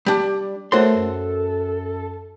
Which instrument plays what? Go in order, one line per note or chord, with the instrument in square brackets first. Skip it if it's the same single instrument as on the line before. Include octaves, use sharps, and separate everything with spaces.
[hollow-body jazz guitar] G3 D4
[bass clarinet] A3 [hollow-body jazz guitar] F#4 C6 [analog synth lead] A4 [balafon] A#4 C5 C#5
[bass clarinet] F#2